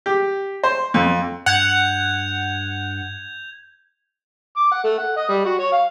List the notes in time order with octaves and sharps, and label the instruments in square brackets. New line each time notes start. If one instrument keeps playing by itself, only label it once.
[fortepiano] G4
C5
F2
[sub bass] G2 [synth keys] F#5 [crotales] G6 G#6 F7
[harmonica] D6
F#5
A3
F#5
D#5
G3
F#4
C#5
F5